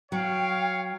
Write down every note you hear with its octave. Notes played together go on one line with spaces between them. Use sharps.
F#3 C#5 F5 G5